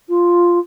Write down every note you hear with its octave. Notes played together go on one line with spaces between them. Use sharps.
F4